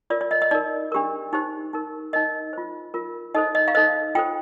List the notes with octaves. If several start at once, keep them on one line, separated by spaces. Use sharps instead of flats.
F4 A#4 D5
D5
D#5
D#5
D#4 A#4 D5
D4 G4 A#4
D#4 G4 C5
D#4 A#4
D#4 A#4 D#5
F4 C5
F4 A#4
D#4 A4 C5 D#5
D#5
F5
D#4 A4 C5 D#5
F4 A4 C5 G5